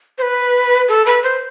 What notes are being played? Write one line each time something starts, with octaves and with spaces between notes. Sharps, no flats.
C5
B4
A4
B4
C5